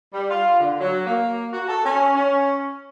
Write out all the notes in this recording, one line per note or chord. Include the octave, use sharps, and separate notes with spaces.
G3
F4
D3
F#3
A#3
F#4
A4
C#4
C#4